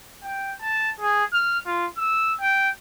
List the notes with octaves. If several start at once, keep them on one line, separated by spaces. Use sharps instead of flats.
G5
A5
G#4
F6
F4
E6
G5